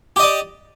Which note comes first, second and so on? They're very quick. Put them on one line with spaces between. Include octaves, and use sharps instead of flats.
G4 D#5 D5